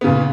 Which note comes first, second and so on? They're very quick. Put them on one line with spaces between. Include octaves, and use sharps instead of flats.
B3 C#3 A#2